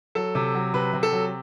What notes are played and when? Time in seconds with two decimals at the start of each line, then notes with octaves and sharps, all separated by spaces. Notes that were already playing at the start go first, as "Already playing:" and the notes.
0.15 F#3 A4
0.35 C3
0.54 F#3
0.74 C3 B4
0.93 C3
1.03 A4
1.13 F#3